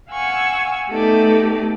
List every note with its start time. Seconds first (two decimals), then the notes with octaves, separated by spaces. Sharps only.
0.10 F5 F#5 G#5 C#6 E6
0.90 A3 B3 D#4 G4 A4 D5